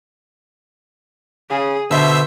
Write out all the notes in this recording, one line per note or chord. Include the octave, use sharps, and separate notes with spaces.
C#3 G#4
B2 D3 C5 E5 E6